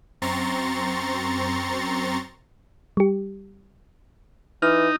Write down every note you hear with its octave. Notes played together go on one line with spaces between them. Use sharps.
F#2 C4 A#5 C6 C#6 A6
G3 G4
E3 D#4 F6